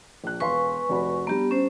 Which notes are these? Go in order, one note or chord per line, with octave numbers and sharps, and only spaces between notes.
A#1 F#6
E1 B4 F5 G#5 C6 C#6
F1 F#4 B5
G3 B3 D4 G4 A#5
C#4 C5